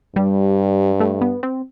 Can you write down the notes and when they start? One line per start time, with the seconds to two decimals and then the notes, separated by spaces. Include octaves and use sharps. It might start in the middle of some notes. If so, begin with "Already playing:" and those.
0.16 G2 G3
1.00 A3
1.21 B3
1.43 C4